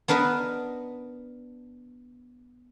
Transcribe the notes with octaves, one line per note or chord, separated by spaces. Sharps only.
B3 D4 A#4 B4 D#5